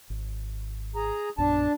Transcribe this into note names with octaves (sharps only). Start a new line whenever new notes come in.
G#1
G#4 A#5
A#1 F#2 B3 D4 A5